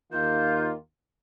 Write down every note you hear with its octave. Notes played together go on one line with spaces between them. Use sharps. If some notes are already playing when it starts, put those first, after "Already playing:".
D#2 D#3 A#3 F4 G6